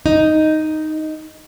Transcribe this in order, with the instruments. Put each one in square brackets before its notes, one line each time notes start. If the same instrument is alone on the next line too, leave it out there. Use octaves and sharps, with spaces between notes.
[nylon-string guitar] D#4